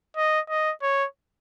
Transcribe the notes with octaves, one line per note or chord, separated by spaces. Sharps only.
D#5
D#5
C#5